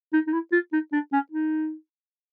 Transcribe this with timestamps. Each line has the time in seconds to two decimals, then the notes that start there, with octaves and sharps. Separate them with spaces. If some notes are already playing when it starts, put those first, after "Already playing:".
0.13 D#4
0.27 D#4
0.33 E4
0.52 F4
0.73 D#4
0.93 D4
1.13 C#4
1.32 D#4